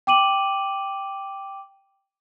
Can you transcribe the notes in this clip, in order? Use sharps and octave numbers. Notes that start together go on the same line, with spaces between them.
G5 D6 D#7 F#7